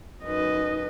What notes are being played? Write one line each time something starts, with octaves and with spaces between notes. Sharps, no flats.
F#2 D#4 B4 D#5